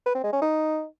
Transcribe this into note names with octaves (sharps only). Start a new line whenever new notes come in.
B4
C4
G#3
C#4
D#4